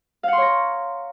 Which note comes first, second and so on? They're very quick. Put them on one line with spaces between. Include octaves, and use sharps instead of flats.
F5 F#5 C6 C#5 A#5